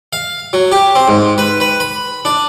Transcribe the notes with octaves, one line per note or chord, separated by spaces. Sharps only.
F5
F#3
G4
C4
G#2
B4
B4
B5
D4